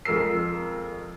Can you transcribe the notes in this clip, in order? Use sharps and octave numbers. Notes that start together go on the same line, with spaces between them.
F2 G#3 A#4 E6 C7